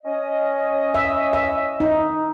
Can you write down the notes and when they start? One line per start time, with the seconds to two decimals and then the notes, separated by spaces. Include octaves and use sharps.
0.04 C#4 D#5
0.94 E5
1.33 E5
1.80 D#4